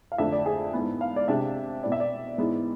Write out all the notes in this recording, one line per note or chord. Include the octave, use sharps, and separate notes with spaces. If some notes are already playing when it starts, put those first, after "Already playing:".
F5
F2 D3 A3 D4 E5
D5
G#4
G#2 E3 B3
F5
D5
C3 G#3 D4 E5
B2 B3 E4 D5
E5
D5
G#2 E3 G#3 B3